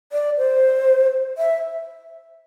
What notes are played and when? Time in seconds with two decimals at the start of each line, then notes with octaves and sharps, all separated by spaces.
0.12 D5
0.37 C5
1.38 E5